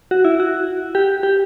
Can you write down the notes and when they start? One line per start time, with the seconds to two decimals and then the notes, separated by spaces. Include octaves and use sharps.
0.11 F#4
0.25 E4
0.40 F#4
0.95 G4
1.23 G4